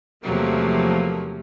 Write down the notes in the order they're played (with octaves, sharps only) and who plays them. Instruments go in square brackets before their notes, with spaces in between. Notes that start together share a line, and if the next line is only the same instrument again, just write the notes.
[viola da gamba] E2 C3 F#3 [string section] F3 A3 A#3